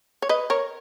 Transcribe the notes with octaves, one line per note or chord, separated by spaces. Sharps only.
C#5
B4 D#5
A#4 C#5